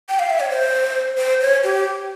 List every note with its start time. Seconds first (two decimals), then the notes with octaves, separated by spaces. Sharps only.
0.09 G5
0.19 F5
0.30 E5
0.40 C#5
0.50 C5
1.18 C5
1.41 C#5
1.64 G4